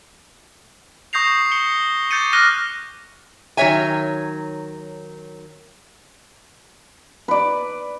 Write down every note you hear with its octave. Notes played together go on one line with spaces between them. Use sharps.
C#6 D#6 G6 A#6 C7 F7
C#7 G7
D6 G6 A6 C#7 D#7
D6 F6 F#6 A#6 D#7 G7
D#3 F#3 C#5 E5 G#5
B4 D5